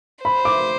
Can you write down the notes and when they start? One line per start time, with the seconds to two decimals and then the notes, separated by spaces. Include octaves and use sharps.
0.24 C5 B5
0.45 D6